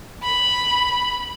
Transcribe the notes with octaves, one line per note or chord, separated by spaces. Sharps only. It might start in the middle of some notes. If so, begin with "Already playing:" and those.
B5